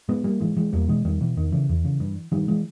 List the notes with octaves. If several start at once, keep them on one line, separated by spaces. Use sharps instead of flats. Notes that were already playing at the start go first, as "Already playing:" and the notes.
G#2 G#3 B3
G3 A#3
G#2 E3 G#3
E3 G#3
E2 G3 A#3
B2 E3 G#3
E2 D#3 G3
B2 E3
E2 D#3
C#3 E3
E2 E3
C#3
G2
G2 D#3 G3
E3 G#3